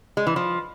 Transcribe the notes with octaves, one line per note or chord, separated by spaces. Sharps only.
G#3
E3
F3